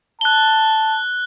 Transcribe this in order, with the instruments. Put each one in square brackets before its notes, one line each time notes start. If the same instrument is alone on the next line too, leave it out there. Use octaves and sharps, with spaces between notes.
[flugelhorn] A5 [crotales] F#6 G7